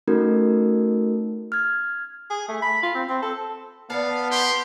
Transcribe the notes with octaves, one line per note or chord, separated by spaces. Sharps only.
A3 C#4 D#4 F#4 A4 A#4
F6 G#6
G#4
A3
B5
F4
C4
C4
A4
B3 D5 F5 F#5 A5
G4 C6